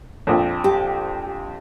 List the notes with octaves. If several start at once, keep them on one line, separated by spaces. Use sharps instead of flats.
A#1 F2
G4